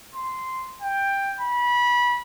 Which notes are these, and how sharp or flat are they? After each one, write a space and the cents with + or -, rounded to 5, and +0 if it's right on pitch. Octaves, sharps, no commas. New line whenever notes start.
C6 -10
G5 +10
B5 -25